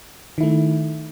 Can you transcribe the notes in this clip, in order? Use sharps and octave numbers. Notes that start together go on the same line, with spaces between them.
D#3 A3 E4